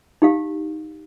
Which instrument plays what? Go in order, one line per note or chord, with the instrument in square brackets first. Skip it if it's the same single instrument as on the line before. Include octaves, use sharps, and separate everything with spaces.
[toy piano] D#4 G4 F5